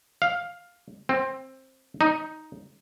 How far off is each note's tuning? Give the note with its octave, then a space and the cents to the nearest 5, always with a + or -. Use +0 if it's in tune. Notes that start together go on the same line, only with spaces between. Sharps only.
F5 +10
C4 +15
D#4 +5